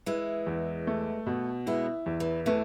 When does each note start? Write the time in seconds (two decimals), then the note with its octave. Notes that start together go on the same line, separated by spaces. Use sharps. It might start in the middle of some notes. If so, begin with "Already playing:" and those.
0.06 E3 G#3 E4
0.47 E2
0.87 A3
1.26 B2
1.66 G#3 B3 E4
2.06 E2
2.20 E3
2.46 E3 A3